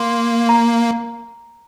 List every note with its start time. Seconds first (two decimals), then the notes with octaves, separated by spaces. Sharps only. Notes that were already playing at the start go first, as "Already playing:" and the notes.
Already playing: A#3 C6
0.49 A#5